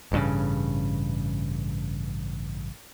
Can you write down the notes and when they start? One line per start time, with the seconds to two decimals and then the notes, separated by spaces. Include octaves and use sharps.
0.12 A1 G2 C#3